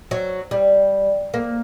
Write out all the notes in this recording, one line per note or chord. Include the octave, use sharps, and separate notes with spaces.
F#3
G3
A#3